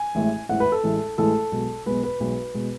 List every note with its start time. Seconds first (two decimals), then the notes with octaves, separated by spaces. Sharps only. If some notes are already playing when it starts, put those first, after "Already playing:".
Already playing: G#5
0.15 A1 A2 E3 G#3
0.49 A1 A2 E3 G#3 F#5
0.60 B4
0.72 A4
0.84 A1 A2 E3 G#3
1.18 A1 A2 E3 G#3 A4
1.52 B1 B2 G#3
1.86 B1 B2 G#3 B4
2.03 B4
2.20 B1 B2 G#3
2.55 B2 G#3